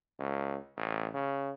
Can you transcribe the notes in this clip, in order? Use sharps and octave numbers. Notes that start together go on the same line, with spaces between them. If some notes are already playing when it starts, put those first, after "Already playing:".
C#2
A1
C#3